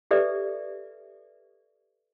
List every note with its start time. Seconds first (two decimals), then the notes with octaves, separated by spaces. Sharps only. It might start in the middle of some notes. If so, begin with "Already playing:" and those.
0.11 G4 A4 B4 D5 E5